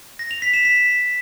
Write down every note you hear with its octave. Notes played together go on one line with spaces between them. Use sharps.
A#6
F7
B6
E7
B6